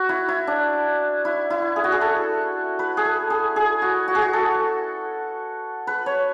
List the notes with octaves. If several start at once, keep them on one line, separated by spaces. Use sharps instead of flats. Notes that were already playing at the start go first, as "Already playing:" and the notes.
Already playing: F#4
E4
E4
D4
E4
E4
G#4
F#4
G#4
A4
B4
G#4
A4
G#4
G#4
F#4
F#4
G#4
F#4
A4
B4
C#5